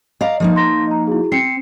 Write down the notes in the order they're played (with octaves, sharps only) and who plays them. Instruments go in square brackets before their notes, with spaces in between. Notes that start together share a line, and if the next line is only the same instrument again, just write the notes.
[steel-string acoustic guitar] D5 F5 A#5 [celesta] D#5
[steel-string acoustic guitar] F3 A#3 D#4
[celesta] A#5 C6 A#6
D#5 A#5
E4 F#4 G#4
[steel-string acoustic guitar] C4 [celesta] C7 C#7